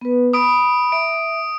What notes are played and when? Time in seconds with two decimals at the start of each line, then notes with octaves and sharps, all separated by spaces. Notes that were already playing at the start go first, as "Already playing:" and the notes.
0.01 B3 B4
0.33 B5 D#6 D7
0.92 E5 D7